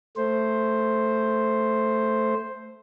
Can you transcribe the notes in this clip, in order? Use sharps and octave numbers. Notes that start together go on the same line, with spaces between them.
A3 C5